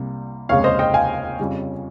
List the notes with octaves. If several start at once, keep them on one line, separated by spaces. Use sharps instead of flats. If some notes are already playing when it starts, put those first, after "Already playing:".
Already playing: C2 C3 G3 A#3
F1 D#2 C#3 G#3 C#5 F5
C5 D#5
D#5 G5
F5 G#5
F2 C#3 G3 C#4